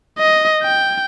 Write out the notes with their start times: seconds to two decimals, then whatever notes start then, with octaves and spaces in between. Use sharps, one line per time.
0.18 D#5
0.63 G5